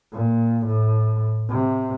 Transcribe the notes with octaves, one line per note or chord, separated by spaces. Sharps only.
A#2
A2
C3